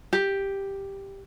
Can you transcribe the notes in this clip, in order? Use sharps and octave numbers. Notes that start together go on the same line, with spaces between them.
G4